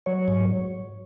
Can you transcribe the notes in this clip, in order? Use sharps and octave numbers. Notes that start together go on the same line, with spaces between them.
F#3 C#5
G#2